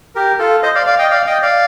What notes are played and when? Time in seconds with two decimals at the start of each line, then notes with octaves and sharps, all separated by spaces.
0.15 G4 A#4
0.39 F4 A4
0.63 C5 D#5
0.75 D5 F5
0.87 D5 F5
0.99 D#5 G5
1.11 D5 F5
1.27 D#5 G5
1.42 D5 F5